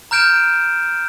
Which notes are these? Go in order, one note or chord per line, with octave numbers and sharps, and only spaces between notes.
A#5 F6 G6 D7 E7